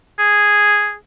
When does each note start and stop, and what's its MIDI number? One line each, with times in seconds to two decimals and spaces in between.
0.19 0.95 68